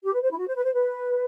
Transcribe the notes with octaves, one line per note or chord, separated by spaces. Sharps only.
G4
B4
C5
E4
F#4
C5
B4
C5
B4